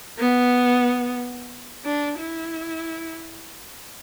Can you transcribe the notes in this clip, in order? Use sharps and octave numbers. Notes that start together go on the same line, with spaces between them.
B3
D4
E4